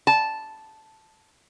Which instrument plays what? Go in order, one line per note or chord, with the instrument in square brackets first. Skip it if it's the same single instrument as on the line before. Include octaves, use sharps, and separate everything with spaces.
[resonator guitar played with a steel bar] A5